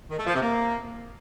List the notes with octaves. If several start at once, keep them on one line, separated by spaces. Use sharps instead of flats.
D#3
A3
F3
C3
A#3